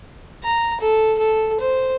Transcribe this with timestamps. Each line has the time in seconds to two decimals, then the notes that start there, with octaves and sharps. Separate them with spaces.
0.43 A#5
0.80 A4
1.18 A4
1.60 C5